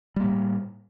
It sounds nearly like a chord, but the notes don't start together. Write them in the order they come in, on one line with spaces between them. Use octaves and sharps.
G3 A#3 A2